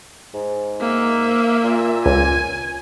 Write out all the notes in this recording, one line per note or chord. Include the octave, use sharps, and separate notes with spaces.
G#2
A#3 E5
A#2
C#2 G#5